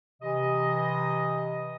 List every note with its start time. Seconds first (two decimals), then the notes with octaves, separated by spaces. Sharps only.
0.22 C3 E3 D#5